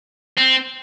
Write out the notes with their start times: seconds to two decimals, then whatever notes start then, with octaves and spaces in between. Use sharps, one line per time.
0.38 C4